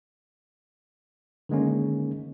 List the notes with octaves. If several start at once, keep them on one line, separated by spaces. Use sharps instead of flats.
D3 D#3 G#3 A#3 C#4